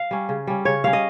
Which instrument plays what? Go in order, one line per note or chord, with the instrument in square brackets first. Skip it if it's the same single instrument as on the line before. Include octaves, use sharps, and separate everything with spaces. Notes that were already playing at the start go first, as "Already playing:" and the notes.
Already playing: [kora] F5
G3 C#4
C#3
G3 C#4
C#3 C#5
G3 C#4 F5
D#5